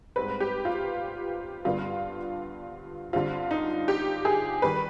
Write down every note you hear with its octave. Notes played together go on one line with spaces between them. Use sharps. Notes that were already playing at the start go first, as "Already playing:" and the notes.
G#2 G3 C4 B4
G4
F4
G2 D3 G3 B3 F4
G2 D3 G3 C4 F4
D#4
G4
G#4
D#3 G3 B4